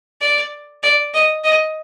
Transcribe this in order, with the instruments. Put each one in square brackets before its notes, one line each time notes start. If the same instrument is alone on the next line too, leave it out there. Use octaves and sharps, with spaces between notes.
[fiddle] D5
D5
D#5
D#5